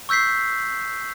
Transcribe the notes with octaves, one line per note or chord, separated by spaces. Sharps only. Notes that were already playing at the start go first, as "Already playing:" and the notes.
C#6 E6 G6 B6 C7